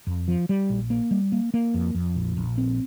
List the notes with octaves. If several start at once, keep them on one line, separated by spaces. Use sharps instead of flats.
F2
F3
G3
A#1
A#3
G3
A#3
A#3
F2
F2
A#1
A#1
C4